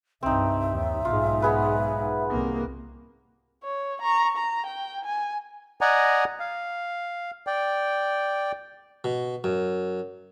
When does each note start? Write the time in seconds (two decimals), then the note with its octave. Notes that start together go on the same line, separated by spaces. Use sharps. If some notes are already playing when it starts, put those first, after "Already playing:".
0.23 C2 G2 C4 D#4 E5
0.73 D#2
1.05 B1 G#2 F4
1.42 B3 G#4 B4
2.31 C2 A#3
3.63 C#5
4.02 A#5 C#6
4.37 A#5
4.67 G5
5.05 G#5
5.81 D5 D#5 F#5 G#5 A#5
6.40 F5
7.47 D5 G5
9.04 B2
9.44 F#2